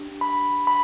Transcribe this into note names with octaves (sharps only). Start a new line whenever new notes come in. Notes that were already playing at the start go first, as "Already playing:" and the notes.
Already playing: D4 G4
B5
B5